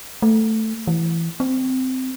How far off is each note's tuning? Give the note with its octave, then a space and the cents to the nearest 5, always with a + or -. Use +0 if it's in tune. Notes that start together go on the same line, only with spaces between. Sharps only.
A3 +5
E3 +10
C4 -15